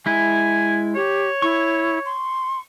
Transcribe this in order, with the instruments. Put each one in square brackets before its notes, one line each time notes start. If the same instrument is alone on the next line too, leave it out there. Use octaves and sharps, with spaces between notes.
[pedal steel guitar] G#3 E4 [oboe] G#5
[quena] G4 [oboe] C#5
[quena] E4 [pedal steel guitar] C#6
[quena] C6